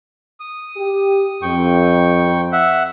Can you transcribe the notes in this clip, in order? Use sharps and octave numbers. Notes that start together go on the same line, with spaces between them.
D#6
G4
F2 G5 C#6
E5 F#5